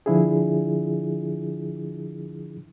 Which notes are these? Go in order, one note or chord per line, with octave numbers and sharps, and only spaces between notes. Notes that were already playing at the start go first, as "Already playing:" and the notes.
D3 F3 D4 E4 F4 G#4